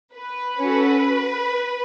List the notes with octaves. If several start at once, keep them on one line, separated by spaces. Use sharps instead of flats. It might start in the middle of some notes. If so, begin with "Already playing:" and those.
B4
C#4 F#4 A4